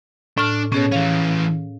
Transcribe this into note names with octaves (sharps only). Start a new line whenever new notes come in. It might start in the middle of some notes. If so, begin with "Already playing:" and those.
A2 D4 F6
B2 C#4 G#4 C#5
E3 C#4 F5